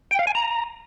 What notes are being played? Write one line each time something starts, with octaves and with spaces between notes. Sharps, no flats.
G5
F5
G#5
A#5